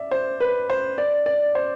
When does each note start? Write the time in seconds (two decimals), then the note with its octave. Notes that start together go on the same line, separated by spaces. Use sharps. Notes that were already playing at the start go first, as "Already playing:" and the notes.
Already playing: D5 E5
0.11 C5
0.40 B4
0.70 C5
0.98 D5
1.26 D5
1.55 C5